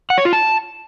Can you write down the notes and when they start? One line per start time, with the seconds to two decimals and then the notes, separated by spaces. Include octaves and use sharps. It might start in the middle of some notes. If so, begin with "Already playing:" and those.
0.10 F#5
0.18 C#5
0.25 F4
0.33 A5